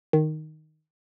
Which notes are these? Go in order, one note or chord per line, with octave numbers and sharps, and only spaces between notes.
D#3